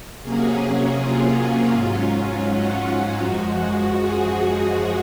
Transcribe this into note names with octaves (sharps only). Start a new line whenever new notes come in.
C3 F#3 A#3 C#4 G#4
F4
G#2 F#3 C#4
F#4
F#2 F3 G#3
G#4